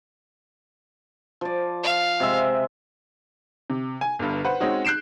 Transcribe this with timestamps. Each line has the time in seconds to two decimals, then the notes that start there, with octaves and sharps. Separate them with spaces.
1.41 F3 D5
1.83 F5
2.20 C3 G#3 E5
3.70 C3
4.01 G#5
4.19 G1 G2
4.45 B4 C5 F#5
4.60 G#3 C4 C#4 D#4 F#4
4.85 F#6 G6 C7 D7 E7